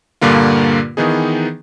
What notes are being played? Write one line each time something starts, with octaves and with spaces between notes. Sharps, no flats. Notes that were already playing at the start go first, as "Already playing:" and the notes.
G2 A#2 D3 A#3 F4
D#3 E3 B3 D#4 G#4